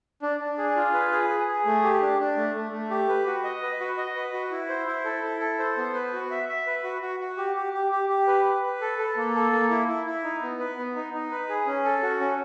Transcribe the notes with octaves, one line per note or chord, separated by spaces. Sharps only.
D4
D4
G#4
F4
B4
G#4
G#4
G#4
A3
G4
D4
D4
A3
A3
A3
G4
B4
F#4
D#5
B4
F#4
D#5
B4
F#4
E4
C5
E4
A4
E4
A4
C5
B3
B4
F#4
E5
E5
B4
F#4
F#4
F#4
G4
G4
G4
G4
G4
B4
B4
B4
A4
A4
A#3
A4
A#3
E4
E4
E4
D#4
B3
B4
B3
D#4
D#4
B4
G#4
C#4
A4
F#4
C#4